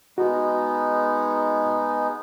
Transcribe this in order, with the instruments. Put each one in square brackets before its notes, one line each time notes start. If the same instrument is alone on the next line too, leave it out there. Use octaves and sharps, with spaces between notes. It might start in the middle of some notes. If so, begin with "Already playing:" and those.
[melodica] G#3 B3 D#4 [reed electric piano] F#4